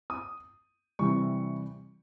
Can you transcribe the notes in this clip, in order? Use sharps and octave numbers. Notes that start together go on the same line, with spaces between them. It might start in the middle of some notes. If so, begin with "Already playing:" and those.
D#6
C3 E3 G3 C#6